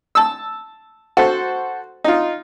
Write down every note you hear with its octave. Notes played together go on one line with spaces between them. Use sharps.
A5 E6
F#4 A4 C5
D#4 F4